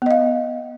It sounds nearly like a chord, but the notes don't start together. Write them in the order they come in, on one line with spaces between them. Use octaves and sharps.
B3 D#5 F5